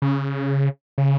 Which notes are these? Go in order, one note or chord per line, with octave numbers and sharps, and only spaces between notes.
C#3
C#3